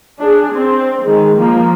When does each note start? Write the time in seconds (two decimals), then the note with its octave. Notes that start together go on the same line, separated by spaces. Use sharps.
0.19 D4 G#4
0.54 C4
1.05 D#3 G#3
1.37 F3 A#3